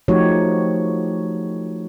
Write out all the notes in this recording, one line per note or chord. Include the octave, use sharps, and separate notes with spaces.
F3 A3 D#4 F#4 G4 C#5